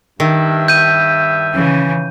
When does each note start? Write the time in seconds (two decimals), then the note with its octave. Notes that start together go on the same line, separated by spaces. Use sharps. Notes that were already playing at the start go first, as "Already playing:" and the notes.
0.20 G2 D#3 E5
0.68 G6 D#7
1.53 C#3 E3